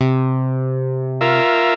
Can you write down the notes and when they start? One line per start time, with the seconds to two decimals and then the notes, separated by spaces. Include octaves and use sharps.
0.01 C3
1.21 F4 A#4 E5